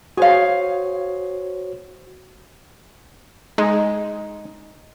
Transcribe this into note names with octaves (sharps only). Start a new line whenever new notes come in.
F#4 G#4 C5 C#5 F5
G#3 D#4